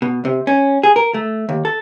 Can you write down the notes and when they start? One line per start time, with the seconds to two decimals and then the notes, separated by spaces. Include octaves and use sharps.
0.02 B2
0.25 C3
0.47 C#4
0.83 G#4
0.96 A#4
1.14 A3
1.49 D#2
1.65 A4